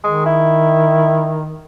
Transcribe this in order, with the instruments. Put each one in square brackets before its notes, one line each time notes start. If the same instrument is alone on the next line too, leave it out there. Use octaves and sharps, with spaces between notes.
[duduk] D#3 [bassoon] G#3
[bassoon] E4